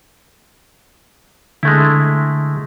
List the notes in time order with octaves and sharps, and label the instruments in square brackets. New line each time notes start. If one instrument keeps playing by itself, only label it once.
[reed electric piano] D3 [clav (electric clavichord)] G#3 A3 E4